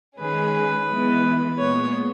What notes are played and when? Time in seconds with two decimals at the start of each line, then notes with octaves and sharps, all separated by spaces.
0.19 D#3 G#3 C#4 G#4 B4
0.89 E3 G#3 B3
1.58 A#2 G#3 B3 C#5